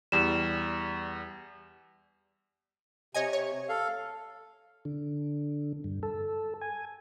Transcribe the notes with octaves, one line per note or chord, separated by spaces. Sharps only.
E2 G3 E7
C3 C#5 D#5 G#5
C#5
A4 F5
D3
G2
A4
G#5